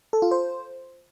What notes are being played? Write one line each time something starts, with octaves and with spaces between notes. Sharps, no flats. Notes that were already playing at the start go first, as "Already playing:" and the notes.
A4
F4
C5